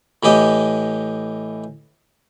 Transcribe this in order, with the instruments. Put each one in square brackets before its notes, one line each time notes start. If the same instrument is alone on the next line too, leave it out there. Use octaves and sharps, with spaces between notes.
[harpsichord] A2 E3 G4 D#5